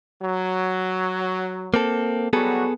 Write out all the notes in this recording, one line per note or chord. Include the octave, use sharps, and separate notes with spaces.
F#3
A#3 C4 A4
F#3 G3 B3 F#4 G#4 A4